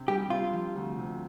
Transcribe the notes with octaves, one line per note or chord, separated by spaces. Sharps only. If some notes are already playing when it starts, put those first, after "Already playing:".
Already playing: C3 D4
G3 G4
C3 F4
F3
D2
C3